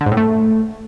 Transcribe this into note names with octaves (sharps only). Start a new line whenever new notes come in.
D3
G#2
A2
A3